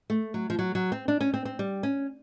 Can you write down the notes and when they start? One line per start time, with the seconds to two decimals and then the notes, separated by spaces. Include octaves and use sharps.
0.10 A3
0.34 F#3
0.50 F3
0.59 F#3
0.75 F#3
0.92 C4
1.08 D4
1.21 C#4
1.34 C4
1.45 C4
1.59 G3
1.83 C#4